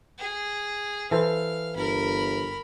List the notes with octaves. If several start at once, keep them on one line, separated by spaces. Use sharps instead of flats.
G#4
E3 A4 C5 F5
G1 A#4 B5